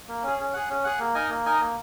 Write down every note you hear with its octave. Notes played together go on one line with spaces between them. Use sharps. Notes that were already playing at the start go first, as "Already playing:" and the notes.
A#3
C#4 G#4
C#4
G#4 F#5
C#4
G#4 F#5
A#3
D#4 A#4 D#5 G#5
A#3
D#4 A#4 D#5 G#5
A#3